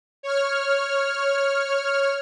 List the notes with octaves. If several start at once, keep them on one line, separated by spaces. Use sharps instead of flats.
C#5 F6